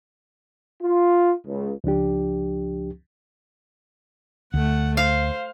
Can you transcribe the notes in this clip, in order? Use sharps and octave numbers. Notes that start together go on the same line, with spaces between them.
F4
C#2
C#2 F3 D4 G4
D2 A3 F#5
C5 F5